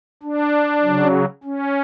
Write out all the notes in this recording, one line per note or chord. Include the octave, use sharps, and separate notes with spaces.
D4
C#3 F#3
C#4